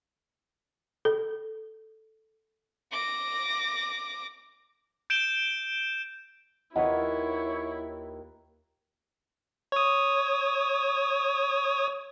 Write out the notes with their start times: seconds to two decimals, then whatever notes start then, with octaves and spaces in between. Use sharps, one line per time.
1.05 A4
2.92 D6 A#6
5.10 G6 D7 E7 G7
6.75 D#2 E4 F4 B4 C#5 D#5 F#5
9.72 C#5 D#6